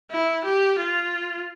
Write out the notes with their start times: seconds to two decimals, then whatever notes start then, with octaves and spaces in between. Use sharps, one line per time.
0.11 E4
0.45 G4
0.79 F4